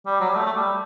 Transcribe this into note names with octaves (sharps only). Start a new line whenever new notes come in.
G3
F#3
G3
A3
A3
G3